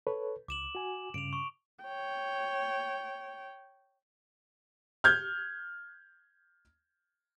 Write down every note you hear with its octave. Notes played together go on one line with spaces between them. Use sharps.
A4 B4 C#5
C#2 D6 E7 F#7
F#4 G#5
G2 C#3 D7 F7
C#6
C#5 G5
F6 G6 G#6